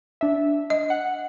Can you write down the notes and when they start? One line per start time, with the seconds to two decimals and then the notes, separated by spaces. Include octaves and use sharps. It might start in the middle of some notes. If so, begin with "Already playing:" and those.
0.21 D4 E5
0.70 D#5
0.90 F#5